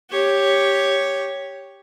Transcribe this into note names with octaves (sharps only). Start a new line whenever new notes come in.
G4 C#5